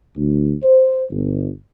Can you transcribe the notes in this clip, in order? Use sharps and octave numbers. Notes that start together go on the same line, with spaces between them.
D2
C5
G1